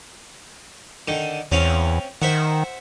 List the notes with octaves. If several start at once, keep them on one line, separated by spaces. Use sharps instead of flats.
D3 D#3
E2 C4 C#4 F5
D#3 C5 E5 F#5